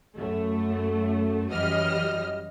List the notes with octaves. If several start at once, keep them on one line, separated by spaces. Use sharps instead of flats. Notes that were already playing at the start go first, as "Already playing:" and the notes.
F#2 A3
F#2 E3 G3 D#5 F6